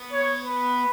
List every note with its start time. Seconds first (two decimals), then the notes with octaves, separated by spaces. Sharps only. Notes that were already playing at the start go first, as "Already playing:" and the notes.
Already playing: B3
0.12 C#5
0.43 B4